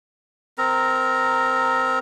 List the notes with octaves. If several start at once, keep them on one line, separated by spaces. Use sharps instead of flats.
C4 A#4 A#5